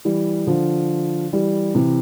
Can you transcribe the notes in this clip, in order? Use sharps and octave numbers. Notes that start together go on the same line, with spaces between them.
E3 G3
D3 F3
E3 G3
C3 E3